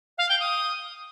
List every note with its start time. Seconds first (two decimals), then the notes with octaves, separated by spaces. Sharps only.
0.18 F5
0.29 G5
0.40 D#6